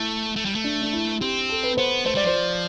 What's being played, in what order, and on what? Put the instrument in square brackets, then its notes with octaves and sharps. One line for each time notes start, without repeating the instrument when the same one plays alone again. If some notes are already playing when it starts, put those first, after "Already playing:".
Already playing: [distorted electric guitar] A3 [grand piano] E4
[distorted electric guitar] A3
G3
A3
[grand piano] D4
D4
E4
[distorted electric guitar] C4 [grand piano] G4
[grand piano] A4
B4
[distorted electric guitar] B3 [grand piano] C5
[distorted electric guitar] A3 [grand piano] C5
[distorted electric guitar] G3 [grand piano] D5
[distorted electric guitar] F3 [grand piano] C5